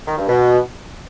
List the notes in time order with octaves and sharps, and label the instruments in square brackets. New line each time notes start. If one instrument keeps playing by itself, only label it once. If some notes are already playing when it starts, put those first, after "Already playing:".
[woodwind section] D#3
G2
B2